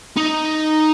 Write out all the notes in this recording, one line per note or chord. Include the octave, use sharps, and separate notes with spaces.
D#4